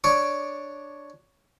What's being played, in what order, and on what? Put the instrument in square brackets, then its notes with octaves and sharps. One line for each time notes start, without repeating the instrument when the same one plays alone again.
[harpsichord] D4 C#5 C#6 D6